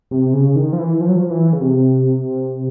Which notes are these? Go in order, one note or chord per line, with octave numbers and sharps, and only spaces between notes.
C3
C#3
D#3
F3
E3
F3
F#3
F3
E3
C#3
C3